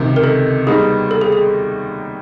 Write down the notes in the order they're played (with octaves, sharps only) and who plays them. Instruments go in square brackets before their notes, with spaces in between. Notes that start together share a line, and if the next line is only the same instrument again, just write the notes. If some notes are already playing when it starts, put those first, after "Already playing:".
Already playing: [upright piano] C#2 C3 D#3
[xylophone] A#4
A4
[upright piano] D#2 D#3 G3 B3 D#4 [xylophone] G#4
[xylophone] A4
G#4
G#4